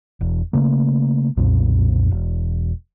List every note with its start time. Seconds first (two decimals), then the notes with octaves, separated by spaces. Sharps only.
0.21 E1
0.53 C#3 A3 A#3
1.37 B1 F2 A#2
2.11 E1